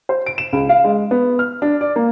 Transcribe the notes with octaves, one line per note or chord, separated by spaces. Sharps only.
C5
D7
E7
C#2
F5
G#3
B3
F6
D4
D5
A#3